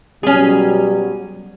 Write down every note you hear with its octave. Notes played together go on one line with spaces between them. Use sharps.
B2 F#3 G3 C#4 G#4